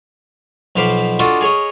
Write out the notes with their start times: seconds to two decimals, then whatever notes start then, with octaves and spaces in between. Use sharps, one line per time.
0.76 B1 B2 F3 F5 B5 D6
1.19 D4 F4 F#4 A4 D5 D#5
1.41 G#4 A#4 C#5 D#5